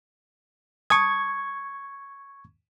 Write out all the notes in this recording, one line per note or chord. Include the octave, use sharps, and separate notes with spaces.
A5 C#6 D#6 G#6